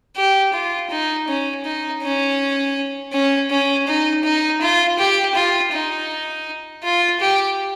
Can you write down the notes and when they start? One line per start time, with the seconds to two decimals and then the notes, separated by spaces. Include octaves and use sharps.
0.17 G4
0.53 F4
0.91 D#4
1.28 C#4
1.65 D#4
2.03 C#4
3.13 C#4
3.50 C#4
3.87 D#4
4.24 D#4
4.61 F4
4.99 G4
5.35 F4
5.73 D#4
6.83 F4
7.20 G4